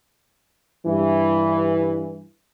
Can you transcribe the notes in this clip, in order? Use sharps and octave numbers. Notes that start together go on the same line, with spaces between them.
G2 E3